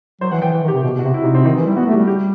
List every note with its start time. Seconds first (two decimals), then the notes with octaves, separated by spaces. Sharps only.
0.21 F#3 C5
0.31 E3 F#5
0.42 E3 G5
0.52 E3
0.63 D#3
0.68 G4
0.73 C3
0.83 B2 G4
0.93 B2
0.99 F#4
1.04 C3
1.14 C3 E4
1.24 D#4
1.34 C4
1.45 D#3 D#4
1.56 E3
1.61 E4
1.66 G3
1.76 B3 F#4
1.86 A3
1.92 G4
1.97 G3
2.07 G4